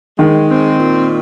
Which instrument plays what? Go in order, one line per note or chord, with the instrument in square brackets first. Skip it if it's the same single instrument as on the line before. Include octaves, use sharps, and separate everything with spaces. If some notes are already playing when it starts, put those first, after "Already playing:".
[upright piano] D#3 [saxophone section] G#3
[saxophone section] C4
A#2